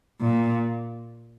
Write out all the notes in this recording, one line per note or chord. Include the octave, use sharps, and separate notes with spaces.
A#2